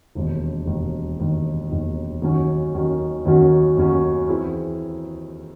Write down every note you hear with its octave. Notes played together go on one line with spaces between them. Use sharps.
E1 D#2 D#3
E1 D#2 D#3
E1 D#2 D#3
E1 D#2 D#3
D#2 D#3 F#3 C#4 F#4
D#2 D#3 F#3 C#4 F#4
D#2 D#3 F#3 C#4 F#4
D#2 D#3 F#3 C#4 F#4
E3 C4 E4 G#4